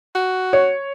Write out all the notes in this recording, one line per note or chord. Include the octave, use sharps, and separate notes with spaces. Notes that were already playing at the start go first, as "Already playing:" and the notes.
F#4
C#5